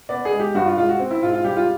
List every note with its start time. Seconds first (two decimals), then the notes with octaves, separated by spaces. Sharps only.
0.09 B3 D5
0.25 G#4
0.32 G#3
0.40 G4
0.55 G2 F#4
0.66 F4
0.77 G#3 F4
0.89 F#4
0.99 C4
1.11 E4
1.23 G#2 F4
1.33 F4
1.44 G3 G4
1.57 F4